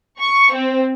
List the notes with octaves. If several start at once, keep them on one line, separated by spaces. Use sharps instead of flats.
C#6
C4